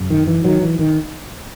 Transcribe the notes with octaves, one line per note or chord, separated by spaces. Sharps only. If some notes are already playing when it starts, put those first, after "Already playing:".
Already playing: F#2 C#3
D#3
E3
D#3 F#3
E3
D#3